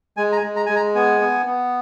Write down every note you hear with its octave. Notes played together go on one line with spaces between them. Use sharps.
G#3 G#5
A#5
G#5
G#3
A#5
G#3 G#5
A#5
B3 G#5
B3
B3